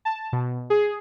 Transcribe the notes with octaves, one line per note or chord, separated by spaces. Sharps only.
A5
B2
G#4